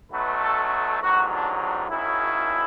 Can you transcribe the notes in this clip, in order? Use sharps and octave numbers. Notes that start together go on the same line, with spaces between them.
B1 B2 F#3 A3 B4
A4
A4
A1 G#2 F#3 F#4
D4
D4
G#1 F#2 C#3 E4